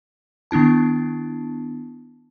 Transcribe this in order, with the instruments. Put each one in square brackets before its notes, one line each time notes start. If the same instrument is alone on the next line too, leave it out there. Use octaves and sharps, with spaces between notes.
[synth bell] D#3 B3 D4 E4 A5